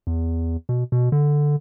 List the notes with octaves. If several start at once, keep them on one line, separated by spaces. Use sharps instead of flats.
E2
B2
B2
D3